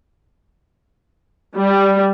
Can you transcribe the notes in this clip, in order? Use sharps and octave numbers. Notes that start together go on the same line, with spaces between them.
G3